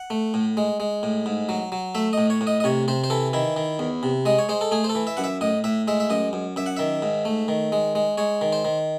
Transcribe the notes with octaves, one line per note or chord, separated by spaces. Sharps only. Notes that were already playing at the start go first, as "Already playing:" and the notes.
Already playing: F#5
A3
A2
G#3
G#3
A2
G#2
F#3
F#3
A3 E5
A2 D#5
C#5
A2
D#5
D#5
C3 C#5
C3 C5
C5
E3 A4
D#3 E4
D#3
E2
C3
G#3 D#5
C#5
G#3 C5
A4
A3 G#4
C5
A4
E3
E5
F#2 F#5
E5
A2 D#5
A2 E5
G#3 E5
E5
F#2 D#5
F#2
F#2 E5
F#5
D#3 E5
G#2
A3
D#3
G#3
G#3
G#3 C#5
D#3
C5
D#3